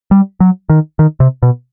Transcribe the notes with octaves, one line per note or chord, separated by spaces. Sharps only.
G3
F#3
D#3
D#3
C3
B2